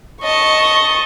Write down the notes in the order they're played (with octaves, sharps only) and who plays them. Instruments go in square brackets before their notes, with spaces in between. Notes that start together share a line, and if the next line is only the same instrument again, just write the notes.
[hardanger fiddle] D#5 A5 [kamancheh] C#6